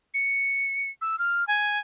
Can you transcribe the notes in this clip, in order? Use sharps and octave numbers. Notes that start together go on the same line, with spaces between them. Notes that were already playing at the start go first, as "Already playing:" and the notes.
C#7
E6
F6
G#5